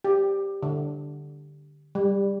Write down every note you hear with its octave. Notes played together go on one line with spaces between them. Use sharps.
G4
D3
G3